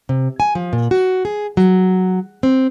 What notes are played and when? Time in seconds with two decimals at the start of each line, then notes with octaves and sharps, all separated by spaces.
0.09 C3
0.40 G#5
0.55 F3
0.73 A#2
0.91 F#4
1.25 G#4
1.57 F#3
2.43 C4